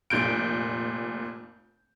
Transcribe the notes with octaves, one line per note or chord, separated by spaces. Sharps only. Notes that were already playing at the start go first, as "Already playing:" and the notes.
F1 A#2 G6 D7